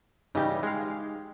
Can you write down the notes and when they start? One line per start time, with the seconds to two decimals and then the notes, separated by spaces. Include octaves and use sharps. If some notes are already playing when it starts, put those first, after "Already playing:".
0.35 C#3 E3 G3 D#4 G4
0.63 G#3 F5